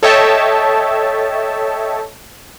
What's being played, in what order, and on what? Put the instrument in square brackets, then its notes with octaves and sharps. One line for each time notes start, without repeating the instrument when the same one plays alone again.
[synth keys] A4 C#5 D#5 E5 G5 A5